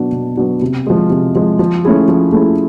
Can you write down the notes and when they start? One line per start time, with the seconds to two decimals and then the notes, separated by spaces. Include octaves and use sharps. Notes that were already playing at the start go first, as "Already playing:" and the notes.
Already playing: B2 F#3 B3 D4 F#4
0.12 B2
0.37 F#3 B3 D4 F#4
0.62 C3
0.87 F3 G#3
1.10 C3
1.35 F3 G#3
1.59 F3
1.84 A3 C#4 E4 G#4
2.08 F3
2.33 A3 C#4 E4 G#4